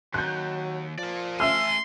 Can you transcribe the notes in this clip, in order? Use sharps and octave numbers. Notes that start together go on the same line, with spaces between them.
D#2 F#3 F#6 G6
F3 A#4 D5
A3 E5 G#5 C6 E6 F6